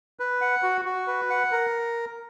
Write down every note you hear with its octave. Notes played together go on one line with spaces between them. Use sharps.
B4
F#5
F#4
F#4
B4
F#5
A#4